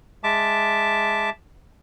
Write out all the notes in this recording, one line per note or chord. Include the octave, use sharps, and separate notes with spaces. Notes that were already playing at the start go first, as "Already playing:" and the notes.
G#3 E5 A5 D6